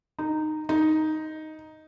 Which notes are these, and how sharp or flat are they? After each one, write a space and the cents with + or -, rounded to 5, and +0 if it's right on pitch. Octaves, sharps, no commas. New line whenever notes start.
D#4 -10
D#4 +5